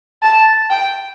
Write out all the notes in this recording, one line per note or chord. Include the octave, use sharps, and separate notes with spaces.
A5
G5